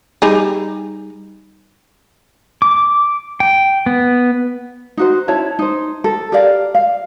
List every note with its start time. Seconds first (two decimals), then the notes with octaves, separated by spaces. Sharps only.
0.22 G3 D#4 G#4
2.62 D6
3.40 G5
3.86 B3
4.97 D#4 F#4 C5
5.28 C#4 E4 C#5 A5
5.59 D#4 C5
6.04 A4
6.32 G4 A#4 D5 F5
6.75 F5